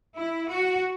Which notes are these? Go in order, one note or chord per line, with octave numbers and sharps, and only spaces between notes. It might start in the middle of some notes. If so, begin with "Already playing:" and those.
E4
F#4